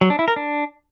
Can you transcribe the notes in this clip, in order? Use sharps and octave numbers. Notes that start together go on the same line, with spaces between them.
F#3
D4
E4
A#4
D4